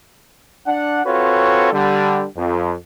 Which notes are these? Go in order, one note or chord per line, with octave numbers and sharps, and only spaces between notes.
D4 F#5
C4 F4 F#4 A4 B4 C#5
D3 G3
F2